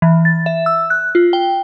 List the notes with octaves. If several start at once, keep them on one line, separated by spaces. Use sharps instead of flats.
E3
A6
E5
E6
F#6
F4
G5